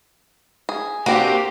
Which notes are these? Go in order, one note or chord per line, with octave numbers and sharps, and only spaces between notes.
G#4
A#3 C4 D4 F#4 G4